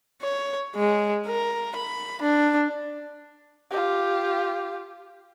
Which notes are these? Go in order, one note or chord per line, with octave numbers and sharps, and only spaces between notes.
C#5
G#3
A#4
B5
D4
F4 G4